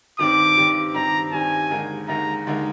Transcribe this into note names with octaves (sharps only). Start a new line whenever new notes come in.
G2 D#3 G3 C4 D6
G2 D#3 G3 C4
G2 D#3 G3 C4 A#5
G2 D#3 G3 C4 G#5
D#2 D3 G#3 D#4 A#4
D#2 D3 G#3 D#4 A#4 A#5
D#2 D3 G#3 D#4 A#4